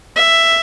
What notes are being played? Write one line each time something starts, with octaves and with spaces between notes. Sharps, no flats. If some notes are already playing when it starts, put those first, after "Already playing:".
E5